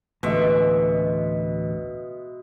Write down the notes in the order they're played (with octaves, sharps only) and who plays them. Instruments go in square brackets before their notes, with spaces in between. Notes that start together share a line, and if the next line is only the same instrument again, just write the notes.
[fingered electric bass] A1 D2 [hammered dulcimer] B2 G#3 E5